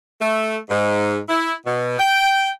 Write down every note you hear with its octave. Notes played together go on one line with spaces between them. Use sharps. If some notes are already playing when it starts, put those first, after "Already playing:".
A3
G#2
E4
B2
G5